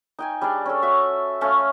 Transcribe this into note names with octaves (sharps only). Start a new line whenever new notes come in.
D#4 G5 G#5
G3 D4 G#4 D5
C#4 A4
F#4 E5
A3 C#4 F5